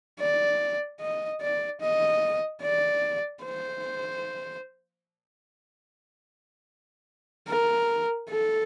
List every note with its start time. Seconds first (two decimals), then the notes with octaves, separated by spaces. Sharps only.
0.20 D5
1.01 D#5
1.41 D5
1.81 D#5
2.63 D5
3.44 C5
7.48 A#4
8.30 A4